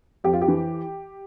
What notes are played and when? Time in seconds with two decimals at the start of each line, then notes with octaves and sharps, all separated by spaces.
0.24 F2 G4
0.33 F4
0.41 G4
0.48 E3